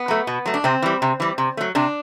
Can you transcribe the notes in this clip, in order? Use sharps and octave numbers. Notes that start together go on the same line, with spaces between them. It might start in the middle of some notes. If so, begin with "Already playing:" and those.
Already playing: B3
F#3 A3
B2
F#3 A3
D4
C3 C4
E3 G3
C3
E3 G3
C3
F#3 A3
C3 D4